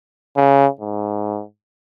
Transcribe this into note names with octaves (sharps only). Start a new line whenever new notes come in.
C#3
G#2